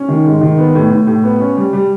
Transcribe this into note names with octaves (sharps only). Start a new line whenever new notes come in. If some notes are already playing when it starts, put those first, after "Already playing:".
Already playing: C#4
D#3
G#2
D#3
B3
A2
A2
A2
B3
C#4
G3
G3